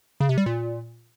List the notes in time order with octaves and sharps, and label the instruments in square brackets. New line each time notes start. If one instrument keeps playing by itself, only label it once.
[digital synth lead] C#3
C3
G3
A#2